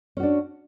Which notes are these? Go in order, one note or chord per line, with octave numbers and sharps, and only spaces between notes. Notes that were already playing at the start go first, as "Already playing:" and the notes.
C#4 D4 F#4